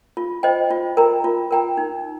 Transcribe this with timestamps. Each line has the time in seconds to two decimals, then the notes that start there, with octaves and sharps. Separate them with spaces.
0.17 F4
0.43 C5 D#5 G5
0.71 F4
0.97 A#4 G5 A#5
1.24 F4
1.51 A#4 G5 A#5
1.77 D#4